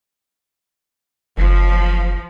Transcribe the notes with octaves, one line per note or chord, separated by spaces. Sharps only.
F#1 F3